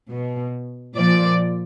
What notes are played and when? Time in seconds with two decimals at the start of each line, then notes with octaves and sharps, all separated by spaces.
0.11 B2
0.96 A#2 F3 D5